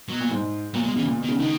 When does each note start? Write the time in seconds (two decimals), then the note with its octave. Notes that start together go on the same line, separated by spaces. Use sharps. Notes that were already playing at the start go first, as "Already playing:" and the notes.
0.09 B2 F#3
0.20 A#2
0.31 G#2
0.74 A#2 F#3
0.85 B2 G#3
0.96 C#3 E3
1.06 A#2
1.18 B2
1.23 D#3
1.29 C#3
1.39 B2 D#3